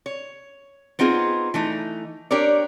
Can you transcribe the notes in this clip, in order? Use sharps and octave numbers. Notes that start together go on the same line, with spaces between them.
C#5
B3 C4 D#4 F4 G#4
E3 A3 D#4
D4 G4 A#4 C#5 D5